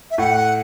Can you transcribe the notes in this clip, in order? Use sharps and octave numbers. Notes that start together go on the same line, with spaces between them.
E5
A2 F#5